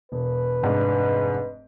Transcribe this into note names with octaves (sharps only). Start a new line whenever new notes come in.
E1 B4
F1 G#2 D4